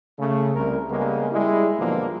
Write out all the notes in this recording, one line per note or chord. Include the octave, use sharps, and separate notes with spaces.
C#3 A3
C2 A#4
C#3 G3 G#3 A#3 B3
G3 G#3 E4
F2 B2 D3 E3 F3 A#3